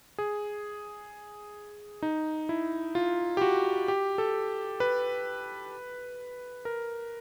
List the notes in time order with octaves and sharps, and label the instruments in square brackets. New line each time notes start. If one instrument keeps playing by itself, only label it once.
[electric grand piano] G#4
D#4
E4
F4
G4
F#4
G4
A4
B4
A#4